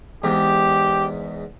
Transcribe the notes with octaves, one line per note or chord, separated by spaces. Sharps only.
E2 G#2 G4